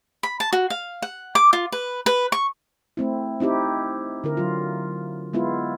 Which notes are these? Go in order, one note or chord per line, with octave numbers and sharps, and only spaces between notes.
B5
A5
F#4
F5
F#5
D6
F4
B4
B4
C#6
A3 C4 E4
C4 D#4 E4 G4
D3 E4 A#4
F#3 F4
G#3 B3 E4 F4